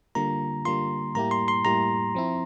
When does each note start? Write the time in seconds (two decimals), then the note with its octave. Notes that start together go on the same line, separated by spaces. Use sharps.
0.15 D3 G3 A#3 F4 A#5
0.65 D3 G3 A#3 F4 C6
1.15 A2 G3 A#3 E4 G4 A#5
1.31 C6
1.48 C6
1.65 A2 G3 A#3 E4 G4 A#5
2.15 F3 C4 E4